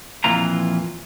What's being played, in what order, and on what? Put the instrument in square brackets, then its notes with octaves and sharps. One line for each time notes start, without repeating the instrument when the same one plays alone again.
[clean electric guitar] F2 A#2 E3 F4 A#5